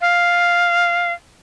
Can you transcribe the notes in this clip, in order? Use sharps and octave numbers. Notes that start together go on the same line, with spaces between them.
F5